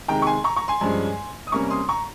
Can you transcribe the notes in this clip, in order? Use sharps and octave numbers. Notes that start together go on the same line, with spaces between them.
C3 D#3 G#3 G5 A#5
C#6
G#5 C6
A#5 C#6
A#5 C#6
G#5 C6
G2 F3 G#3 C#4
D#6
C3 G3 A#3 C#4 A#5 C#6
C6 D#6
A#5 C#6